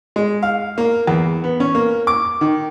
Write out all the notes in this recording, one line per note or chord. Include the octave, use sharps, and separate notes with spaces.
G#3
F5
A#3
E2
B3
C#4
A#3
D6
D#3